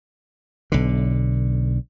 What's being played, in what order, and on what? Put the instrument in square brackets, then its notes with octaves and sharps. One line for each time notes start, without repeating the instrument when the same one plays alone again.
[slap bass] B1 D3